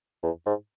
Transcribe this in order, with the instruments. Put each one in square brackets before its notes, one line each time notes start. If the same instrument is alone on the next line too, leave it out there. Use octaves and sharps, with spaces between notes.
[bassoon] E2
G#2